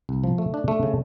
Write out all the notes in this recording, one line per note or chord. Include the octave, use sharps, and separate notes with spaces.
C2
F3
A3
D4
A3
C#3